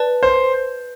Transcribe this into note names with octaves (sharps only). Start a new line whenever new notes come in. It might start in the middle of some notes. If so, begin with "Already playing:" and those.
Already playing: B4 D5 A5
C5